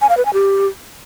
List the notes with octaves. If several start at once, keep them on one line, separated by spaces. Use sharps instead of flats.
G#5
F5
B4
G#5
G4